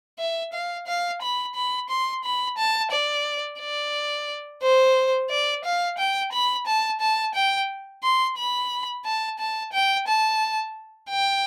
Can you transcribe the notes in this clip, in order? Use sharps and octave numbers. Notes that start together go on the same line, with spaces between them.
E5
F5
F5
B5
B5
C6
B5
A5
D5
D5
C5
D5
F5
G5
B5
A5
A5
G5
C6
B5
A5
A5
G5
A5
G5